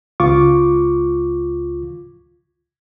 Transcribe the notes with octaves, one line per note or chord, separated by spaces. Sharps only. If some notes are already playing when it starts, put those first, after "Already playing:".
C#2 F4 C#6 D6